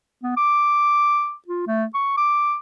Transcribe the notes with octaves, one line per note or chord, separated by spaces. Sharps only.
B3
D6
F4
A3
C#6
D6